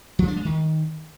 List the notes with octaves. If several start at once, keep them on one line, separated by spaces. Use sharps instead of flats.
F3
D4
G#3
D#3